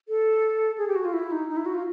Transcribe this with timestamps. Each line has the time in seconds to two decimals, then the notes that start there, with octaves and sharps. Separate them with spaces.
0.09 A4
0.78 G#4
0.88 G4
0.96 F#4
1.05 F4
1.13 E4
1.32 D#4
1.49 D#4
1.57 E4
1.66 F#4
1.74 F4